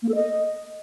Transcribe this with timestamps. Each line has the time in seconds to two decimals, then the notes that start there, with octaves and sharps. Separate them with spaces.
0.03 A#3
0.09 A4
0.15 D#5